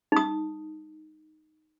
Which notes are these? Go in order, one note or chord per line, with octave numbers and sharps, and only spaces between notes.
D#4 D#6